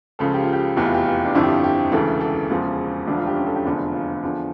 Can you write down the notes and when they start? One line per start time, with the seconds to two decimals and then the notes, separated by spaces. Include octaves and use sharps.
0.19 C#2 C#3 F3 A4
0.34 G4
0.43 F4
0.53 G4
0.77 F1 E2 E3 G4
0.85 F4
0.94 G4
1.06 F4
1.25 D4
1.34 G1 F2 D3 F3 E4
1.43 G4
1.49 F4
1.64 G4
1.92 E1 D2 C#3 E3 A4
2.21 A4
2.50 E1 E2 C#3 F3
3.07 E1 D2 D3 F3 D4
3.18 F4
3.27 G4
3.36 C#4
3.46 A4
3.56 G4
3.65 F1 E2 D3 F3
3.94 F4
4.23 E2 D3 F3